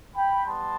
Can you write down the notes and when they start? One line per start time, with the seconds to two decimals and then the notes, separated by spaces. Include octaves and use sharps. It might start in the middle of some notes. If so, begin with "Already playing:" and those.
0.16 G5 B5
0.46 G3 B3 A5 C6